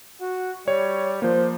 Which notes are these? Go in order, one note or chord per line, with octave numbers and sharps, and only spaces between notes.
F#4
G3 C#5
F3 A#3 C5